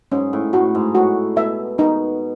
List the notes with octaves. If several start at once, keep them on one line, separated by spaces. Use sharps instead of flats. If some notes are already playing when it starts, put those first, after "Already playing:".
G#2 C#4
A2
A2 F#4
G#2
A2 F#4
B2 E5
B2 D#4